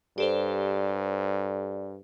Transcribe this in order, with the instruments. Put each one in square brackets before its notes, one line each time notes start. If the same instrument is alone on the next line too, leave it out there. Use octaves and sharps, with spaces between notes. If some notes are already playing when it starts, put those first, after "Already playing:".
[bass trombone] G2 [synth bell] G4 A4 C5 [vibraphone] D5